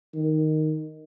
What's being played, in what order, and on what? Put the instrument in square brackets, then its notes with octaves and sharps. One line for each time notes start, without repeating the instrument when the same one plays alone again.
[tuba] D#3